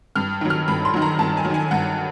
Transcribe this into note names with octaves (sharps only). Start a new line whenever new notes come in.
G2 F6
D#3 F#3
F6
G2 B5
C6
D#3 F#3
A#5
G2 A5
G#5
F#3
D#3 G#5
G2 F#5